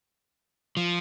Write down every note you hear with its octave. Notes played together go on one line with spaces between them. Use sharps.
F3